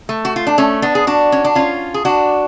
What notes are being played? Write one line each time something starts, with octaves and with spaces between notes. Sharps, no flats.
A3
F#4
F4
D4
A3 C#4
B3 D4
G#4
D4 F#4
C#4
D4
C#4 F4
G#4
D4 F#4